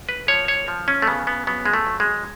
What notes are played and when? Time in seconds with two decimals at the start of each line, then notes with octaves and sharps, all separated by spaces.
0.09 B4
0.28 F3 C#5
0.48 C#5
0.68 F3
0.88 C#4
1.02 A3
1.07 C#3 B3
1.27 B3
1.47 F#3 B3
1.66 G#3
1.73 A3
1.87 F#3
2.00 G#3